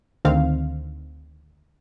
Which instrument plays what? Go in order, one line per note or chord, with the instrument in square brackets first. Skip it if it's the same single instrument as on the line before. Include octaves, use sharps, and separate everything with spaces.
[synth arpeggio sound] D2 D3 D#3 C4 F5